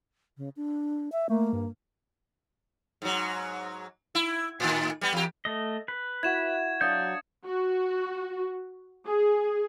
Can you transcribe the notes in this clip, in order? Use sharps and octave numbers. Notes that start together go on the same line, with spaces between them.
C#3
D4
E5
A3 A#3
G2
G#2 F#3
E4
A2 D#3
G3 B3
E2 G4
A3 D#5
B4
E4 F#4 G#6 E7
F#3 D4 F5 D#6 G6 A6 C#7
F#4
G#4